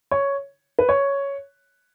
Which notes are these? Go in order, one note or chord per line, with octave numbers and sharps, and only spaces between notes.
C#5
B4
C#5